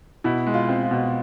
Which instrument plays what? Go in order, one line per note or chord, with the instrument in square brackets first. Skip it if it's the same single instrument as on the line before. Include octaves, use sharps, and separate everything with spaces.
[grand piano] B2 [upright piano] E4
[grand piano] G#3
[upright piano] F4
[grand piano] C4
[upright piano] F4
[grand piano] B2